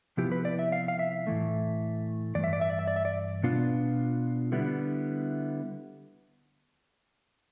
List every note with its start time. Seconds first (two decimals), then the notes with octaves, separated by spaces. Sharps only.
0.17 C3 F3 B3 E4 G4
0.32 B4
0.45 D5
0.59 E5
0.72 F5
0.88 F5
0.99 E5
1.27 A2 E3 A3
2.35 G2 E3 D5
2.44 E5
2.53 D5
2.61 E5
2.70 D5
2.79 E5
2.87 D5
2.96 E5
3.05 D5
3.43 B2 B3 D4 F4
4.52 D3 G3 B3 E4